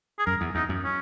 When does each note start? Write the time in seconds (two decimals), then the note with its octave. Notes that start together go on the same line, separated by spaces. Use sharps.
0.19 G#4
0.27 F#2 A#4
0.41 E2
0.55 E2 D#4
0.69 F#2
0.84 C#4